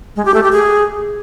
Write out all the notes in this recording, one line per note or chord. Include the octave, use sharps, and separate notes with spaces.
G#3
G4
A3
G4
G#4